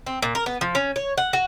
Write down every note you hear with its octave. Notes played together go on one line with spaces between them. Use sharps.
C4
A#2
A#4
B3
F3
C#4
C#5
F#5
F#4